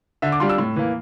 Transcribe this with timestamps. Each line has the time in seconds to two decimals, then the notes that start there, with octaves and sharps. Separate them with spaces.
0.22 D3 E5
0.32 D6
0.40 G3 D4 F4 C6
0.49 E6
0.58 A2
0.76 E3 A#3